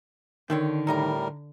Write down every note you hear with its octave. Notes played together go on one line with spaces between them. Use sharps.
D3 D#3 F3 C4 C#5
A2 G3 D#4 A#4 D#5 A#5